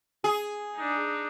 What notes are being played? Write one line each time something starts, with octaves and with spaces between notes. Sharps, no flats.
G#4
D4 D#4